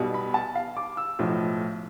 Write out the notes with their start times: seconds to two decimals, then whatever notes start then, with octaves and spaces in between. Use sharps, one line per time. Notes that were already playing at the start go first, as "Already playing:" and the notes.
Already playing: B1 B2 G3
0.14 B5
0.34 A5
0.55 F5
0.77 D6
0.97 E6
1.19 B1 A2 F3